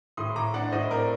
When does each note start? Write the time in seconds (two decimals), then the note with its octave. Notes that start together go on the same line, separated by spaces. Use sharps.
0.17 A2 C6 D#6
0.36 A2 A#5 D6
0.54 D4 D5 F#5
0.71 A2 C5 D#5
0.90 C4 A#4 D5